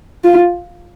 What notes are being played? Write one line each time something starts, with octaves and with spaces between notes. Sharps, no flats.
F4